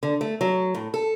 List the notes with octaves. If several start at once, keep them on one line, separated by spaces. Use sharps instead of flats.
D3
A3
F#3
A2
A4